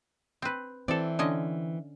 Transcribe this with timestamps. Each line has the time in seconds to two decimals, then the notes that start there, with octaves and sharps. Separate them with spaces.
0.42 C4 B4
0.88 E3 C4 A4 D5
1.19 D3 C#4 D#5